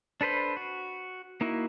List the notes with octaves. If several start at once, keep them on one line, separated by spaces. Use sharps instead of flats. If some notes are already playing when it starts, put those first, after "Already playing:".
D4 A4 B4 C5 B5
F#4
A#3 D#4 E4 F#4